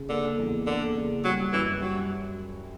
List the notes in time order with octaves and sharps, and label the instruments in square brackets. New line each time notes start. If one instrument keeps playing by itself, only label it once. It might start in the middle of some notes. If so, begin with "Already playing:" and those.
Already playing: [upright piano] C#3
[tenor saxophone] D3 [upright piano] A#3
[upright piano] E2
[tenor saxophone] D3 [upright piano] A#3
[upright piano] C#3
[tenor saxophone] F#3 [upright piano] G3
[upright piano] F#2 [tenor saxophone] E3
[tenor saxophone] F#3 [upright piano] G3